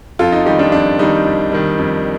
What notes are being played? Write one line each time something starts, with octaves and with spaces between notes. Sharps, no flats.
F2 F4 A4
D#4
D#3 G3 D#4 G4
D4 F4
F2 D4
D#3 G3 D#4
F2
D#3 G3
F2